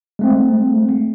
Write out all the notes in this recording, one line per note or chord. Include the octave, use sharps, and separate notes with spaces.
G#3 A3 C4